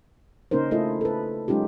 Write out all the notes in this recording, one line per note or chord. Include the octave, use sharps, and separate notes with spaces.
C#3 A#3 C#4 D#4 A#4 C5
A3 E4 F4 A4 D#5
A4 B4
F#3 G#3 C#4 D#4 F4 G4